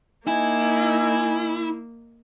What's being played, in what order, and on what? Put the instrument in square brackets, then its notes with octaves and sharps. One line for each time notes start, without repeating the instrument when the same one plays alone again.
[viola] A#3 [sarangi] D#4 [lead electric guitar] E4 [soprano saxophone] G#5